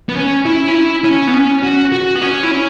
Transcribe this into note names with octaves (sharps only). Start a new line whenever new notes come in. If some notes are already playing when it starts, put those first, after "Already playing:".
B3
C#4
E4
C#4
E4
C#4
B3
C#4
F#4
F#4
B3
C#4
E4
C#4